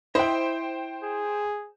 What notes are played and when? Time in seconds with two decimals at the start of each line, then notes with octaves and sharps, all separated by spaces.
0.15 E4 C5 D#5 E5 G5
1.04 G#4